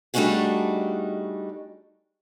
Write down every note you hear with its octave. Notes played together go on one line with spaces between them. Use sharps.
G3 A3 D4 D#4 F#4 G#4